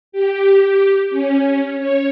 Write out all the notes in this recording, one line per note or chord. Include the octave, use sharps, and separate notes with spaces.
G4
C#4
C#5